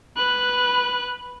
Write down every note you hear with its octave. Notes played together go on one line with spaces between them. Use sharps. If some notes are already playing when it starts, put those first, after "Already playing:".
B4 F#6